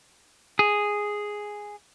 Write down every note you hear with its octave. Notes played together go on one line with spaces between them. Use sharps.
G#4